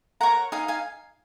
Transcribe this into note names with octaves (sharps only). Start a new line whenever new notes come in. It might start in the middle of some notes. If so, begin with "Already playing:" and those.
A#4 C#5 F#5 A#5
D#4 F5 G#5
F5 G#5